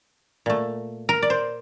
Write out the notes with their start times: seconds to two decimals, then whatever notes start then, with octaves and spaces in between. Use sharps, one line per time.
0.46 A#2 A3
1.09 A#4
1.22 D5
1.30 C5